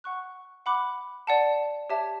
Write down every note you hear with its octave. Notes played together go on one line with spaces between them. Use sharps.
F#5 C#6 F#6
F#5 B5 D6 F#6
D5 F#5 A5
G4 C#5 E5 A5